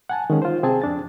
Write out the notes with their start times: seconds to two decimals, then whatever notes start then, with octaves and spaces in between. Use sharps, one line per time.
0.09 F#5 G#5 A5
0.30 D#3 G#3 C#4
0.42 F4 C5
0.63 C3 C4 G#4 G#5 A5
0.82 F2 D4 A6